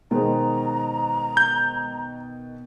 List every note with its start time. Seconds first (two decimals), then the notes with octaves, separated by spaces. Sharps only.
0.11 B2 D#3 G#3 C5 A#5
1.37 G6